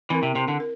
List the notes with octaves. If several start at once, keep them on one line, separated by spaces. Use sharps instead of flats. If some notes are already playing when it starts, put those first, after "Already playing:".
E3 C4 E4 A#4
C3
C3
D3
A#4